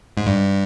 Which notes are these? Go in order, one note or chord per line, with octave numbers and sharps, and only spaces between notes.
G#2
G2